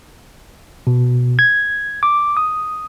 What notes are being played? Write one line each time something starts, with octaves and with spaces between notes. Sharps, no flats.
B2
G#6
D6
D#6